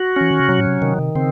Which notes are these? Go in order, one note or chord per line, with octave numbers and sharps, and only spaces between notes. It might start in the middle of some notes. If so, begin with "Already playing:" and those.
Already playing: F#4
E3 C#4
D#3
C#3
C3 F#3
A2
C3
C3 D#3
C3
C#3 C4